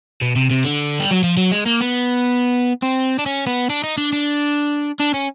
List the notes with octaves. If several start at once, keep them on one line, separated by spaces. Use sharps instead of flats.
B2
C3
C3
D3
G3
F#3
F3
F#3
G#3
A#3
B3
C4
D4
C#4
B3
D4
D#4
D4
D4
D4
C#4